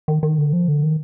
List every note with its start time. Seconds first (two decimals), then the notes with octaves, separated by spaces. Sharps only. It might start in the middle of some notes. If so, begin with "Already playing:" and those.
0.08 D#3
0.23 D#3
0.38 D3
0.53 F3
0.68 D3
0.83 D#3